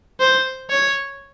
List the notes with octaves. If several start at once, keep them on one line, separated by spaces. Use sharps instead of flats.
C5
C#5